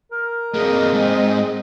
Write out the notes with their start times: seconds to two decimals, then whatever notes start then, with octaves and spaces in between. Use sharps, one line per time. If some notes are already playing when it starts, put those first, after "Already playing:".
0.12 A#4
0.54 G2 A#3 C4 G#4 D#5
0.94 G#2